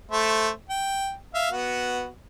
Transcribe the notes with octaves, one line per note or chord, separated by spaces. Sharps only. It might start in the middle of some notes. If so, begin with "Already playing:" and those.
A3 C5 E5
G5
E5 F5
B3 F#4